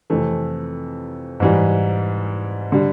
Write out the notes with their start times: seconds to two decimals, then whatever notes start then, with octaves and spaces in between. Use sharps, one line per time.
0.10 F2 C3 E3 A3
1.40 G#2 E3 G3
2.72 D3 G3